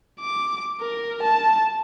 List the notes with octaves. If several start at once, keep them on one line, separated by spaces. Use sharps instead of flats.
D6
A#4
A5